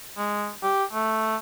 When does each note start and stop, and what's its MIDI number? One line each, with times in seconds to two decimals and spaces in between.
0.17 0.50 56
0.63 0.84 67
0.93 1.36 57